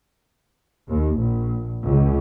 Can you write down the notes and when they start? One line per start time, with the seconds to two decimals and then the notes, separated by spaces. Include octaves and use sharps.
0.88 D#2
1.18 A#1
1.85 C#2